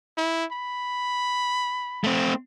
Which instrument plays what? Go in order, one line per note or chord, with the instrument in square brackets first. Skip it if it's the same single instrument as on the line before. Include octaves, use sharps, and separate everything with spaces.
[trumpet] E4
B5
[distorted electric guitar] A3 C4